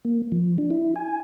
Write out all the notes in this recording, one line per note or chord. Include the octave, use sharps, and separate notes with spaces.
A#3
F3
D4
E4
G#5